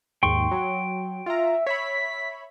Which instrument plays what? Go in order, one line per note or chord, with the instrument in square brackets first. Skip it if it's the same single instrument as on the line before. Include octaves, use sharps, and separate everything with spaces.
[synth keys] D#2 G#2 [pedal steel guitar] G5 C6 C#6
[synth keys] F#3
[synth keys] F4 A#5 [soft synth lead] E5
[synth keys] C#5 E5 B5 [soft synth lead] B6